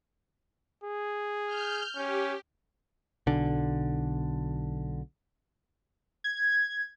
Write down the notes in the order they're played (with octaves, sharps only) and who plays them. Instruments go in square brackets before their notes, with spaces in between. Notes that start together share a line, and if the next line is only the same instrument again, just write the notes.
[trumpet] G#4
[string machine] F6 G6
[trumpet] C#4 [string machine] G4
[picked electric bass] B1 D3
[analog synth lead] G#6